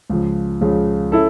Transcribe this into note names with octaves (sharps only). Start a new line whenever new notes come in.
C#2 C#3 F3
C#2 C#3 F3
C#4 E4 A4